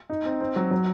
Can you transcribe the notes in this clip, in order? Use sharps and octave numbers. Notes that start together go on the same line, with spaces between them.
D#4
C4
C4
F#3
F#3